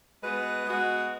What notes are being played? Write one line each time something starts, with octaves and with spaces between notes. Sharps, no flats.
G#3 B3 F#4 B4
G#3 B3 F#4 B4